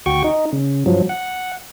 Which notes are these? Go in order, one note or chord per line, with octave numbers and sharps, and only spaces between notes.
D2 F#4 G5 C#6
D#4
C#3
G2 F3 F#3
F#5